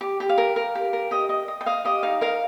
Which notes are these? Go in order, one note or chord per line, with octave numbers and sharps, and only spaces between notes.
G4
G4
F5
A#4
A#4
G4
A#4
G4 D#5
D#5
D#5
G5
D#5 F5
G4 D#5
D#4 F5
A#4 F5